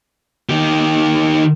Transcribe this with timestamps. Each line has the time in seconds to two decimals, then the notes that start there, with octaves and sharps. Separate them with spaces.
0.49 D#3 G4